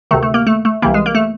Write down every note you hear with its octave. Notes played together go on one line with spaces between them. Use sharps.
D2 C3 D#3 A3
A3
A#3
A3
A3
C2 C3 E3 A#3
G#3
A#3
A3